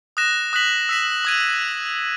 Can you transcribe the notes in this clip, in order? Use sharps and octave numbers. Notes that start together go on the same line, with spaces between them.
D#6 F#6 A#6 E7
D#6 F#6 B6 F#7
E6 B6 E7
D#6 G#6 D#7